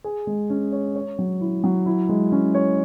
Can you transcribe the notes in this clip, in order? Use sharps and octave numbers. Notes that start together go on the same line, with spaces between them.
G#4
G#3
C#4
C#5
C#5
F#3
E4
F#3
E4
G#3
C#4
C#5